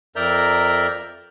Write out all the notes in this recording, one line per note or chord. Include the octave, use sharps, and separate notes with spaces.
F2 A#4 D5 E5 A#5 G6